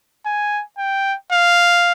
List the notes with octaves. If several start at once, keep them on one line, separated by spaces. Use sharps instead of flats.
G#5
G5
F5